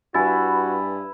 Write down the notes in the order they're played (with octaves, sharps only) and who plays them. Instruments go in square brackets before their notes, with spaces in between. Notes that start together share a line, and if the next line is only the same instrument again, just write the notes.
[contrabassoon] G2 [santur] E4 B4 [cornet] F#4 [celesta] G#5 A6